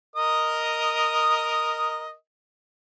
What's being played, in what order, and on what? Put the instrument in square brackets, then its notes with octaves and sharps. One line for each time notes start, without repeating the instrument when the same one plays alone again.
[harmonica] A#4 D#5 D#6